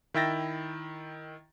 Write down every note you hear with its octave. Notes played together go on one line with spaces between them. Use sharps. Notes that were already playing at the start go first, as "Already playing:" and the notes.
D#3 E4 E5 G5 A6 A#6